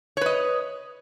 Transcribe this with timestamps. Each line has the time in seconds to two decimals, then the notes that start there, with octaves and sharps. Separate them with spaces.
0.17 C#5
0.21 B4
0.26 D#5